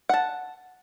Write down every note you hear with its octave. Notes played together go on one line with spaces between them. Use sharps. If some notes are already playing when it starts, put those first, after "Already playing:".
F#5 A5